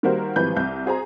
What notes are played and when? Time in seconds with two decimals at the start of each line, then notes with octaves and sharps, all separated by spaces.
0.03 D#3 G3 A#3 F#4 A#4 C5
0.36 G#1 E3 F3 G3 B4 G6
0.56 C2 G6
0.86 F#4 G#4 C5 A#5